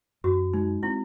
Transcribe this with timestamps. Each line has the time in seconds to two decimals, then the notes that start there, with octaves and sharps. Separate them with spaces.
0.24 F#2 F#4
0.53 G#3 D#4
0.83 C4 E4